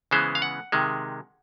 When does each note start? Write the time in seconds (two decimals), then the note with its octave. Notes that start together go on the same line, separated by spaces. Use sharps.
0.11 C#3 E3 G#3 B3 C5
0.35 F5
0.42 F#5
0.72 C3 D#3 G#3